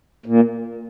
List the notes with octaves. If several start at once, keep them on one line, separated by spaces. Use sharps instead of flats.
A#2